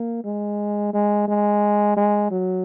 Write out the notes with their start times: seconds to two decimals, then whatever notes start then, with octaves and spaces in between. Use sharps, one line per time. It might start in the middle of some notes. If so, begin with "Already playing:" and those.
Already playing: A#3
0.24 G#3
0.94 G#3
1.28 G#3
1.97 G#3
2.31 F#3